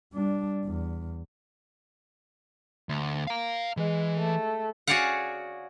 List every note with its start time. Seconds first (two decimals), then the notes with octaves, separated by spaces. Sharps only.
0.13 G3 D4
0.65 E2
2.89 D2
3.27 F5 A#5
3.77 E3 G#3
4.17 A3
4.87 F#4 G#4 C#5 D5 F5 F#5